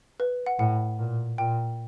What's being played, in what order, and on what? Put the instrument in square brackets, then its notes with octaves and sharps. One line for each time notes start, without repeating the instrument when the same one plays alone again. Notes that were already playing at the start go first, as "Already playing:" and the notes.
[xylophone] B4
F#5
[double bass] A2 [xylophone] F#5
[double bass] A#2
[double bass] A#2 [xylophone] G5